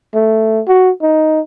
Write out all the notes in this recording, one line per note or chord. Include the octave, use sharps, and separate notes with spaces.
A3
F#4
D#4